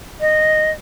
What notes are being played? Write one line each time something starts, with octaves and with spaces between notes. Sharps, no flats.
D#5